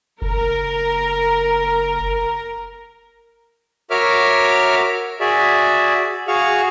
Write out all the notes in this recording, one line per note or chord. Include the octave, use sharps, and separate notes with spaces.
F#1 A#4
F#4 A#4 C#5 E5 D6 F6
F#4 G#4 D5 E5
F#4 G#4 F5 C#6